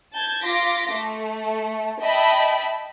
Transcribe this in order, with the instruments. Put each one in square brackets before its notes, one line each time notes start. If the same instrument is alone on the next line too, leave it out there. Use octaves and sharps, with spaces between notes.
[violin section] A5 G6 G#6
F4 C6 D6 A#6 B6
A3
D#5 E5 G5 A5 B5